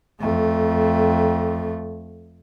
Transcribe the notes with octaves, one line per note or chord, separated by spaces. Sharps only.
F2 A3